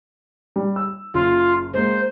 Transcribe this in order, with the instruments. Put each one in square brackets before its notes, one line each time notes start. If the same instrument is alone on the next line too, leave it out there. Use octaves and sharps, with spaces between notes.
[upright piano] G3
E6
[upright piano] F#1 [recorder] F4
[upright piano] G#3 A#3 [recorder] C5